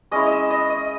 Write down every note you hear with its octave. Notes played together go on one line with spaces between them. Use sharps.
G#3 C#4 E4 D#5
D#5
E5
D#5
D#5